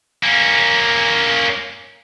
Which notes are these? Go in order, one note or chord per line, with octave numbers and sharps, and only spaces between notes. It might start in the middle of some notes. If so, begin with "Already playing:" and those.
A#3 C#4